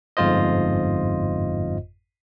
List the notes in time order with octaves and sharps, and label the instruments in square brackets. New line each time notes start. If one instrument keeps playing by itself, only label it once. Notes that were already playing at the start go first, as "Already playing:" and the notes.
[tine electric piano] G1 F2 G#2 F4 C5 D#5